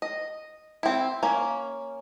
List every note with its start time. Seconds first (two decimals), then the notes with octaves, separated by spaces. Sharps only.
0.02 D#5
0.83 C4 E4
1.23 A#3 C#4